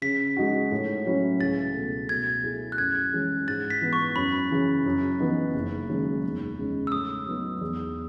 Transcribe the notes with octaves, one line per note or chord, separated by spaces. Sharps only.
C#3 B6
G#3 D#4 F#4
A2
F#3 C#4 E4
C#2 A6
B2 A3
B2 G#6
A3 E4 G#4
F#6
F#2 G#6
E3 G#3 C#4 G#4
G#2 A6
B6
E3 G#3 B3
C#6
F#2 B5
C#3 E3
F#2
C#3 E3 B3 D#4
F#1
F#2 D#3 G#3
E2
C#3 G#3 D#4
E6
A2 D#6
F#3 B3 D#4
E2